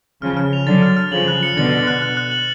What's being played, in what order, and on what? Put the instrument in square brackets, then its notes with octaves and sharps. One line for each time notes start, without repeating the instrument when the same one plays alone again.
[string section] C#3 F3 [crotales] F6
[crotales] F6
F7
[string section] D3 F#3 [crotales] A6
[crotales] F6
F6
[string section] C#3 F3 [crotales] F#7
[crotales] F#6
C#7
[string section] B2 D3 [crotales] A6
[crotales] F#7
F#6
F#6
F#6
F#7